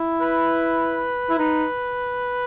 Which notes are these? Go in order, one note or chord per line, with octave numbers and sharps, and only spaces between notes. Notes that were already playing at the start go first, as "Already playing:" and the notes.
Already playing: E4
B4
E4
D#4 B4